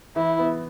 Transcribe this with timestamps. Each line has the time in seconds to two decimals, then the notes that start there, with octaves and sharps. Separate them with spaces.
0.16 E3 E4
0.39 B3